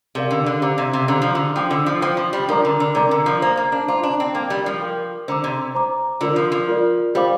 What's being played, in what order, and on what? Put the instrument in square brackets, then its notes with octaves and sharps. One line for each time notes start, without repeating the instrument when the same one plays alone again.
[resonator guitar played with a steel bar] C3 [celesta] G4 A#4 D5 F5
[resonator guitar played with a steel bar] D3
D3
[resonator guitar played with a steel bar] D3 [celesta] G4 C5 F5 A#5 D6
[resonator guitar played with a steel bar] C3
C3
[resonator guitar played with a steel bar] D3 [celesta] G4 C5 F5 A#5 D6
[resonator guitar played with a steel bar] F3
D3
[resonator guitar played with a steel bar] F3 [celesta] C5 G5 D6
[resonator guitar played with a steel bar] D3
F3
[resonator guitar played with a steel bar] F3 [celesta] C5 G5 D6
[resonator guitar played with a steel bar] F3
G3
[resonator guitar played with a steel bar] F3 [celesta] D4 A#4 D5 A#5 D6
[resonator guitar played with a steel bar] D3
D3
[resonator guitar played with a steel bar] C3 [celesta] D4 A#4 D5 A#5 D6
[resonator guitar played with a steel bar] D3
F3
[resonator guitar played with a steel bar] A#3 [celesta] C5 A#5 D6
[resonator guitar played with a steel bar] A#3
D4
[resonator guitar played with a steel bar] F4 [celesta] C5 A#5 D6
[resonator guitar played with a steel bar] D4
C4
[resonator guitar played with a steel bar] A#3 [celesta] A#4 G5 D6
[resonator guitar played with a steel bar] G3
F3
[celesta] A#4 G5 D6
[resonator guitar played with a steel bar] D3 [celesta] C5 A#5 D6
[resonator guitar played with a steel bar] C3
[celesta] C5 A#5 D6
[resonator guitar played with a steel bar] D3 [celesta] F4 A#4 D5
[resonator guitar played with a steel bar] F3
F3
[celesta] F4 A#4 D5
[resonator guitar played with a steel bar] G3 [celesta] G4 C5 F5 D6